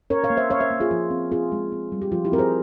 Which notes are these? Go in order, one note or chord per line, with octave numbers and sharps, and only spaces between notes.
C#4 A#4 C#5
C#5 F5
A#3
C5 E5
C#4 C#5 F5
C5 E5
A#3
F4 G#4
F3 F4
C4
C4 F4 G#4
G#3
C4
G3
G4
F3 F4
E4 G4
C4 A#4
G#4 C5